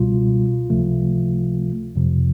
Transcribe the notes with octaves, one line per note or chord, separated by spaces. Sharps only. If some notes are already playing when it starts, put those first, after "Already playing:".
Already playing: C#2 B2 G3 F4
C#2 C3 F3 A3
F2 C3 F3